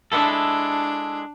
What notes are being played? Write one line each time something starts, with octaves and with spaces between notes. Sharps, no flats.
G#3 D4 E4 A4